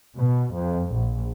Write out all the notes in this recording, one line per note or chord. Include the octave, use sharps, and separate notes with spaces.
B2
F2
A#1